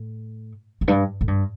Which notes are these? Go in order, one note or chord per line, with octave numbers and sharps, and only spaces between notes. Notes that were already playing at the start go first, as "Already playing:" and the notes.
Already playing: A2
E2
G2
A2
G2